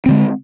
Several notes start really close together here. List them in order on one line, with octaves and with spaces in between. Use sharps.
C4 D3 G#3